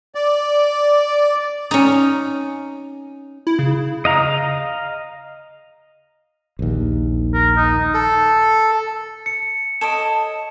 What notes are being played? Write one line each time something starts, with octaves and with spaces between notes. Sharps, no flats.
D5
C#4 D#4
E4
C#3
D#5 F5 A#5
A#1 D#2
A#4
D#4
A4
C#7
A4 C#5 D#5 D7 E7